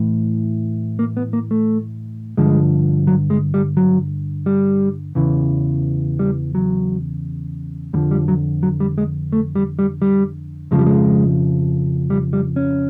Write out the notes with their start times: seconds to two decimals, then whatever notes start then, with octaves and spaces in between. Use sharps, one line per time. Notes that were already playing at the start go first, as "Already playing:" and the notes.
Already playing: A2 E3
0.99 A#3
1.17 B3
1.33 A#3
1.51 A3
2.37 G2 D3 F3 G#3
3.07 F#3
3.30 G#3
3.54 G3
3.77 F#3
4.46 G3
5.15 E2 C#3 E3
6.19 G3
6.55 F#3
7.93 F2 D3 F3 G3
8.11 G3
8.28 F#3
8.63 F#3
8.80 G3
8.98 G#3
9.33 A3
9.55 G3
9.79 G3
10.02 G3
10.71 F2 C#3 F3 G#3
10.79 G3
10.86 G#3
12.10 G3
12.33 G3
12.56 C#4